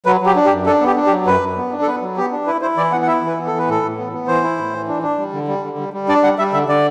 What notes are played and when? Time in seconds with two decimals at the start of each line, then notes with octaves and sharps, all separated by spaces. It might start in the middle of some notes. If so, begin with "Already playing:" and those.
0.06 F#3 B4
0.21 F#3 G4
0.36 D4
0.46 G4
0.51 F#2
0.66 D4 A4
0.81 B3
0.86 G4
0.96 D4
1.06 G4
1.11 F#3
1.26 F#2 B4
1.41 F#2
1.56 B3
1.72 D4
1.82 A4
1.86 B3 B4
2.02 F#3
2.17 B3 G4
2.31 D4
2.46 E4 B4
2.61 E4 C5
2.77 E3 D5
2.92 B3 F#5
3.02 F#5
3.07 E4 E5
3.22 E3
3.27 B4
3.37 B3
3.47 E3 A4
3.58 B4
3.67 A2 A4
3.82 A2
3.97 B3
4.12 B3
4.28 E3 C5
4.43 E4
4.58 A2
4.73 E3
4.88 D4
5.03 D4
5.18 G3
5.33 D3
5.48 G3
5.63 D3
5.78 G3
5.93 G3
6.09 D4 D5
6.23 G3 F#5
6.38 G3 E5
6.53 D3 E5
6.68 D3 D5